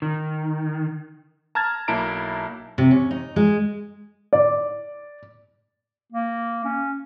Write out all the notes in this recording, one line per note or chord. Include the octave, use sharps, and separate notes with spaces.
D#3
A5 A#5 F6 G#6 A6
B1 A#3 E4 A5 A#5 D7
C3
C#4
D#4
G#3
D5
A#3
C#4